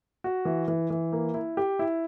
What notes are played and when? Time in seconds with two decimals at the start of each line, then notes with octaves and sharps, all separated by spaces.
0.24 F#4
0.45 E3
0.68 E3
0.90 E3
1.12 A#3
1.34 E4
1.57 G4
1.79 E4